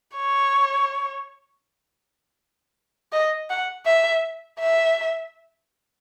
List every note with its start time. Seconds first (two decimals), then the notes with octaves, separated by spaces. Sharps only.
0.17 C#5
3.12 D#5
3.50 F#5
3.86 E5
4.60 E5